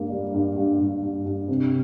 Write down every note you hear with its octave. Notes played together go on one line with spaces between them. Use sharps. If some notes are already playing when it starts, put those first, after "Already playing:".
Already playing: G2 A#3
G3
G2
G2
G2
G2
G2
C3